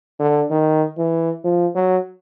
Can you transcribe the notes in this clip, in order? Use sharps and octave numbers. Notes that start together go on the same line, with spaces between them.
D3
D#3
E3
F3
F#3